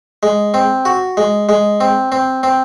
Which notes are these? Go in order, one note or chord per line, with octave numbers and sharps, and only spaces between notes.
G#3
C4
F#4
G#3
G#3
C4
C4
C4